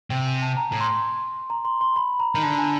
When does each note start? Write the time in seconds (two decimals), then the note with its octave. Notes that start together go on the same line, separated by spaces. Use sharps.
0.10 C3 G5
0.26 G#5
0.42 A5
0.57 A#5
0.72 A2
0.80 C6
1.50 A#5
1.65 C6
1.81 C6
1.96 B5
2.20 A#5
2.34 D#3 A#5
2.43 D3 A5
2.58 G#5